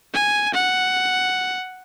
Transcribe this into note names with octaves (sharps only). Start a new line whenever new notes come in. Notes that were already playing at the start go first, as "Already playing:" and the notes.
G#5
F#5